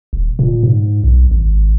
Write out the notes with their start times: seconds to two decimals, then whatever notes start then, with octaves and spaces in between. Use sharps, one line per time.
0.13 D#1
0.39 A#2
0.63 G#2
1.04 B1
1.31 G#1